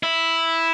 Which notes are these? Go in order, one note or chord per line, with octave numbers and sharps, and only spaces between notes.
E4